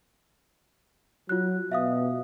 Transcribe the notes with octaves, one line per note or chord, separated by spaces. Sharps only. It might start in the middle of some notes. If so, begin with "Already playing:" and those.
F#3 F4 F#6
B2 E5 F5 D#6